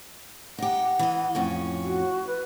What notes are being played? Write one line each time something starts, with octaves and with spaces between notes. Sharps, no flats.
D#4 G4 F#5
E3 D#5
F2 A2 C#4
F#4
B4